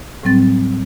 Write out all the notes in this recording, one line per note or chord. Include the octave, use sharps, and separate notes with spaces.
A2 F#3 G3 C4 A6